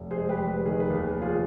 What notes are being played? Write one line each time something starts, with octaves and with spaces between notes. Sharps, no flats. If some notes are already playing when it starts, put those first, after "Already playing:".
Already playing: F1
G#4 C5
G#3
G4 B4
F1
G4 B4
D#3 G#4
B4
D#2 G#4
B4
F1
F4 G#4